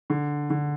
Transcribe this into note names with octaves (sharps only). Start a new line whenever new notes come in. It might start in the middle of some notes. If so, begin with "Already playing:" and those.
D3
D3